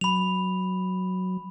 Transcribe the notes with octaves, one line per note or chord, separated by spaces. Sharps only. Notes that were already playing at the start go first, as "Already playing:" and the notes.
F#3 B5 F7